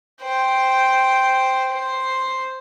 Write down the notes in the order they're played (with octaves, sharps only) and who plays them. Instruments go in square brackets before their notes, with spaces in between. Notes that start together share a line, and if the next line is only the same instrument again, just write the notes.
[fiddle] C5 G5
C5